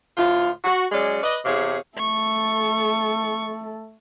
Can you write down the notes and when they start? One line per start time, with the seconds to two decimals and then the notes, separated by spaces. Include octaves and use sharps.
0.17 D2 A2 F4
0.64 F#4
0.92 F#3 G#3 C#4 D5
1.23 B4 D5 D#5
1.45 E2 C3 G#4 C#5 F5
1.98 A3 A4 C#6